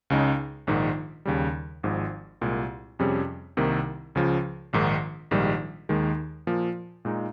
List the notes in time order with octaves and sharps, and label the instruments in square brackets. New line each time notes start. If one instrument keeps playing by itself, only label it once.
[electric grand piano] C#2 C#3 G#3 D#4
A#1 G#2 D#3
D#2 C#3 G3
G#1 G#2 F3
C2 A#2 G#3
F2 C3 G3 C#4 G#4
C2 C3 D#3 A#3
C#2 C#3 F3
A#1 G#2 D#3
A#1 G#2 D#3 G3
D#2 D#3 G#3
A#2 F3 A#3
A#2 G#3 D#4